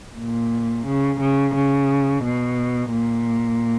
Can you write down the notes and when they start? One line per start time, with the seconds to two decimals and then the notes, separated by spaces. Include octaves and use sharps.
0.18 A#2
0.87 C#3
1.21 C#3
1.55 C#3
2.24 B2
2.92 A#2